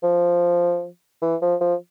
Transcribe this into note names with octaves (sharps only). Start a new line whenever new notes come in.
F3
E3
F3
F3